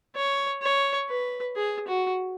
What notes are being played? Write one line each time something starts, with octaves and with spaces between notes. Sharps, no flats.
C#5
C#5
B4
G#4
F#4